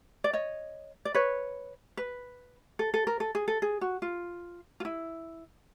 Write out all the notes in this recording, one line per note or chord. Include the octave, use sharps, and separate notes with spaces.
D5
C#5 D#5
D5
B4 C#5
B4
A4
A4
A#4
A4
G#4
A4
G#4
F#4
F4
F4
E4